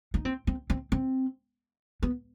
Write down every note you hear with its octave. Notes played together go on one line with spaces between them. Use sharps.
D#4
C4
C4
C4
C4
B3